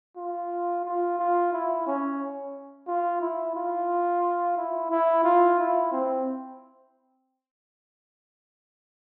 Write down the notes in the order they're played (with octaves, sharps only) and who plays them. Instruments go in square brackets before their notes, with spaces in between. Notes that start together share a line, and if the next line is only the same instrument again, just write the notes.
[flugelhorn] F4
F4
F4
E4
C#4
F4
E4
F4
E4
E4
F4
E4
C4